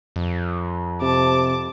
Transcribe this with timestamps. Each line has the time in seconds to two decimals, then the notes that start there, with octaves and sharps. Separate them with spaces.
0.16 F2
1.02 C3 A5 D6